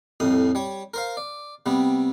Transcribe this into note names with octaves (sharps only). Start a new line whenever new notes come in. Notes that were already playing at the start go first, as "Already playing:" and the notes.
C2 F2 A2 D#6
G3 C#5
A#4 C5 F5
D5
C3 G3 B3